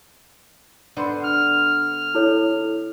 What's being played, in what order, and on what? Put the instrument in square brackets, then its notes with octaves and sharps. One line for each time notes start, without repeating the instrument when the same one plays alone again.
[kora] D3 B3 C5
[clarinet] F6
[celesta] E4 A4 C#5